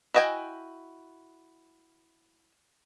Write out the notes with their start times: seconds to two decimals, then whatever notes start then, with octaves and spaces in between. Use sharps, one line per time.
0.14 E4 F#4 D#5 G5 G#5